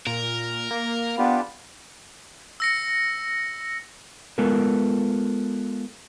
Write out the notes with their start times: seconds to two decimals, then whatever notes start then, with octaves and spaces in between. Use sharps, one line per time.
0.07 A#2 A#4
0.71 A#3
1.18 B3 D4 F4 G4
2.60 E6 A#6 C#7
4.38 G#3 B3 F4 A4 A#4